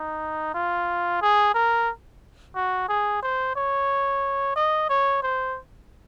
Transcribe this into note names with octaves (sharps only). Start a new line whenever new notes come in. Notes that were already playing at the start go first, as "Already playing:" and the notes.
Already playing: D#4
F4
G#4
A#4
F#4
G#4
C5
C#5
D#5
C#5
C5